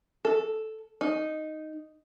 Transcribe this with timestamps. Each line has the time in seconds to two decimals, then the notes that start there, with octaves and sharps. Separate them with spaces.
0.25 A4
1.01 D#4